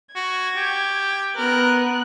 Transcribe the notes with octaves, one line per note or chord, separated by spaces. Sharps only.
F#4 G#6
G4
B3 A#4 F#6